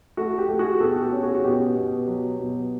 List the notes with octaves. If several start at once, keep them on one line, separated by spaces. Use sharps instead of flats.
A3 F#4
G4
A3
F#4 G#4
B2 G4 A4
F#4
G4
C#4
F#4 G#4
F#4
B2 G4
B2
F#3
B2